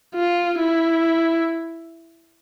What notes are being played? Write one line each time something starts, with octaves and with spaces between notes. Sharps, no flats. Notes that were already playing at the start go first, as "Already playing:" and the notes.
F4
E4